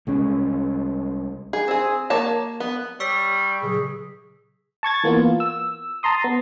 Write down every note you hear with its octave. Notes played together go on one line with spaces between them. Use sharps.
C2 G#3 C#4
G#4
C4 G#4
A#3 C#5 A5
B3
G3 C#5 C#6 E6 B6
A#2 C#3 F#3 G#4
A5 C#6 G#6 A6
E3 A#3 B3 F4
E6
A5 A#5 C6 D#6
B3